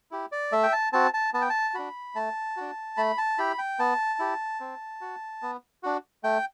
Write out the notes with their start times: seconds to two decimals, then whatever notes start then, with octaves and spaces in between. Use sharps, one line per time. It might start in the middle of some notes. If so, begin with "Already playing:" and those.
0.11 E4 G4
0.32 D5
0.52 A3 E5
0.63 G5
0.73 A5
0.93 C4 F#4 A5
1.14 A5
1.34 B3 A5
1.42 G5
1.50 A5
1.74 D4 F#4 B5
2.15 A3 A5
2.57 D4 F#4
2.97 A3 B5
3.18 A5
3.38 E4 G4 B5
3.58 G5
3.79 B3 A5
4.19 E4 G4
4.60 C4
5.01 F#4
5.42 B3
5.83 D4 F#4
6.24 A3 G5